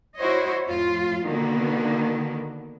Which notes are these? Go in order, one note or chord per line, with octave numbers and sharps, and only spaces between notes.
E4 F#4 C5 C#5 D#5
F2 A2 F4
B2 D3 D#3 A#3 B3